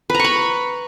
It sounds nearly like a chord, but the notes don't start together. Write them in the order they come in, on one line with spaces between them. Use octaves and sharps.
B4 A#5 C#6 B5